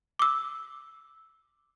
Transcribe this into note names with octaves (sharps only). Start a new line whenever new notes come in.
D6 E6